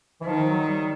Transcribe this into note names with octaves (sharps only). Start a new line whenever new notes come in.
E3
D#3 F3
F#3
G3